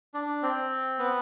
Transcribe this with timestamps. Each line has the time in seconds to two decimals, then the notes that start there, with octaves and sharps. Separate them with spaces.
0.14 D4
0.43 C4
0.99 B3